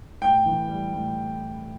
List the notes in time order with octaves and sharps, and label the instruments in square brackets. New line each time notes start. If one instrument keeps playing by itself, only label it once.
[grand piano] A2 G5
E3
G3
A2